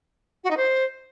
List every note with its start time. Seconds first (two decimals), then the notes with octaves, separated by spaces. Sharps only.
0.44 F#4
0.50 D#4
0.57 C5